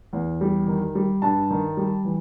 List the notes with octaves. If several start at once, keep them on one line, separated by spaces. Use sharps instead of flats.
E2
G3
D#3
G3
G2 A5
D#3
G3
E3